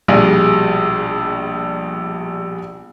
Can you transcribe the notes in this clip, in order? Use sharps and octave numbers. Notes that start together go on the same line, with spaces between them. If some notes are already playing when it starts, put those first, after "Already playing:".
A#1 B2 G3 G#4 F5